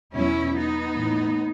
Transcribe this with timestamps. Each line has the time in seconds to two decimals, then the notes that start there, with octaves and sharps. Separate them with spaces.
0.14 E2 B2 F#3 C#4 E4
0.55 B3 D#4
0.95 A2 E3